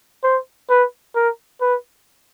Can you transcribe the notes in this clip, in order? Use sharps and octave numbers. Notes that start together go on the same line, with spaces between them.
C5
B4
A#4
B4